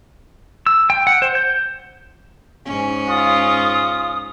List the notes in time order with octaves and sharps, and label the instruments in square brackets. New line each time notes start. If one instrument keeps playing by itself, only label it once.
[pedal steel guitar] E6
G5
F#5
C5
G6
[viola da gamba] G#2 C#4
[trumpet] F4 [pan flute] D#6